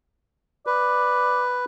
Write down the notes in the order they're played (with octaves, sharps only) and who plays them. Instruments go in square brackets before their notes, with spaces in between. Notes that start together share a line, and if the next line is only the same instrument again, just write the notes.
[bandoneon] B4 [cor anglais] D5